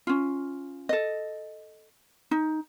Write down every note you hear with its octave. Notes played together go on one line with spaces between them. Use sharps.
C#4 F4
A4 D#5
D#4